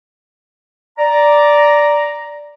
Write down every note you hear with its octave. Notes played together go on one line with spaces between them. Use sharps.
D5 A#5